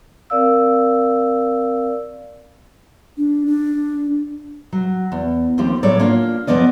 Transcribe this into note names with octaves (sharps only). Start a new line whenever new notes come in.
C4 A#4 D5 F5 E6
D4
D4
F#3
E2
D#2 F3 C4 G4
A2 F#3 A4 C#5 D5
A#3 D4 F4
F#2 D#3 F3 B3 D5 D#5